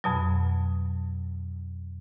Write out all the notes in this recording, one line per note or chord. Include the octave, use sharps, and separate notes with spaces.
F2 B2 F#3